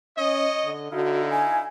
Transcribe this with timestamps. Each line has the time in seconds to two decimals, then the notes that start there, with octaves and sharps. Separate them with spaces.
0.18 C#4 C#5 D#5
0.64 D3
0.93 D3 D#4 E4 F#4 F5
1.31 G#5